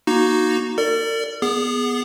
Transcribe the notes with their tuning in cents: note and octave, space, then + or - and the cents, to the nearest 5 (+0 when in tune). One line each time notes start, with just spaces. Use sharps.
A#3 +25 D#4 +0 F#4 +0
A#4 -45 D5 +0
B3 -5 G#4 +0 D#6 -45